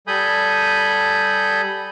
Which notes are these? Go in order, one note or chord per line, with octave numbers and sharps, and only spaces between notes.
G3 A4 G#5 B5 D#6 G6